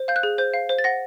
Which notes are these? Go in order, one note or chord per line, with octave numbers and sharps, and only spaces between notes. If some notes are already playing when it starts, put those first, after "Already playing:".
Already playing: C5
F5 G6
F#6
G#4
C5 G6
F5
C5
A6
F#5 A#6